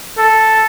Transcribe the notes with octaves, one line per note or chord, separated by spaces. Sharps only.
A4